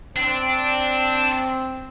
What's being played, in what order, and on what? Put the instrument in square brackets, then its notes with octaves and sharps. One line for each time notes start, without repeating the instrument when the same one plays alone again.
[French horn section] C4 [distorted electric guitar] D4